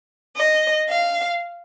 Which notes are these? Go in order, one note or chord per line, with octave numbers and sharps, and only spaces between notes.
D#5
F5